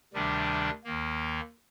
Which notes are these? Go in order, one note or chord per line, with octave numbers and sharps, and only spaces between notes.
D2 C3 D#3 G3 D4
D#2 D#3 A#3